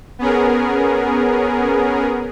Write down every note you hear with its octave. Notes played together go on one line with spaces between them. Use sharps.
B3 C#4 G#4 A#4